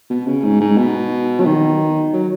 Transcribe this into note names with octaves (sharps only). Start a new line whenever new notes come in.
B2
C#3
G#2
G#2
B2
F#3
D#3
F#3